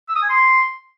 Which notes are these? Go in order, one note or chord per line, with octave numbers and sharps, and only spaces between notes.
E6
D#6
G#5
C6